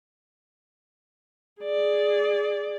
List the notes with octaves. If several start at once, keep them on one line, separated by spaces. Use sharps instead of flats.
G#4 D5